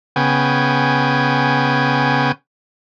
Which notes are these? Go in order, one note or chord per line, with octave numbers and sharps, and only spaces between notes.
C#3 B3 G5 G#5